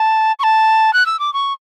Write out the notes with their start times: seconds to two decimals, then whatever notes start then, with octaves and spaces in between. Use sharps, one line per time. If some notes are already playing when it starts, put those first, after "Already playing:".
Already playing: A5
0.39 C#6
0.43 A5
0.93 F#6
1.06 E6
1.19 D6
1.34 C#6